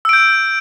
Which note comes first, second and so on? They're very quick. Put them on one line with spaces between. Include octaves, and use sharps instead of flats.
E6 D7 G6